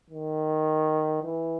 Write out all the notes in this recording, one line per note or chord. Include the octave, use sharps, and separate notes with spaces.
D#3
E3